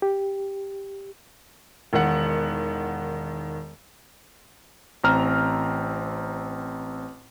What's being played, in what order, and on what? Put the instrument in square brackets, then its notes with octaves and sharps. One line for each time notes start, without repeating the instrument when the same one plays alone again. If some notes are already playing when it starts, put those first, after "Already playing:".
[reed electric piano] G4
[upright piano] E1 D#3 F#5
[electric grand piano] A1 C4 A#5 F6